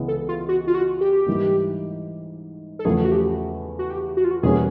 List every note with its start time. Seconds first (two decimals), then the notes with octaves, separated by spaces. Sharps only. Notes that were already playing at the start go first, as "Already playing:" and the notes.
Already playing: C#2 C#3 E3 G#3 B3
0.08 A4
0.29 F4
0.49 F#4
0.67 F4
0.75 F#4
1.01 G4
1.26 G#2 E3 G3 A#3
2.79 A4
2.85 E2 C#3 F3 A3 G#4
3.05 F#4
3.12 G4
3.79 F#4
3.90 G4
4.17 F#4
4.24 F4
4.31 F#4
4.43 E2 B2 G3 A#3 C#4 G#4